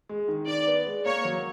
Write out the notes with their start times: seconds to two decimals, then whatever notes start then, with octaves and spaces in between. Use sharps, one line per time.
0.09 G#3
0.28 D#3
0.47 D#3 D5
0.67 B3
0.86 G#3
1.05 A#3 C#5
1.25 F#3